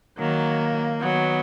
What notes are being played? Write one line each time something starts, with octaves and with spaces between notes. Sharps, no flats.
D#3 F#3 A#3
D#3 F#3 B3